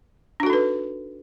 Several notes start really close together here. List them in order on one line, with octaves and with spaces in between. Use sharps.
D4 F#4 A4 D#4 B4